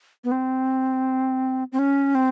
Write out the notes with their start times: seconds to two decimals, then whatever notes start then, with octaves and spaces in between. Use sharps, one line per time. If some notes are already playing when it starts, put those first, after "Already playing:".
0.24 B3
0.32 C4
1.72 C4
1.79 C#4
2.15 C4